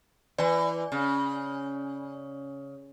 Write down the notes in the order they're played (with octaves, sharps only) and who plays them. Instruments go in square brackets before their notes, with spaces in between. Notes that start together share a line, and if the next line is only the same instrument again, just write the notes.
[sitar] E3 [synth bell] D5 G#5
[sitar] C#3